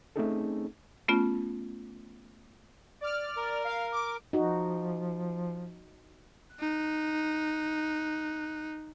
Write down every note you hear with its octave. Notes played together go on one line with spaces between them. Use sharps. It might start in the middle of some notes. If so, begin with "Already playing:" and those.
A3 C4 C#4 D#4 G#4 A4
A3 B3 C#4 F4
D5 F6
A#4
F5
D6
F3 D#4 F#4
D#4 F#6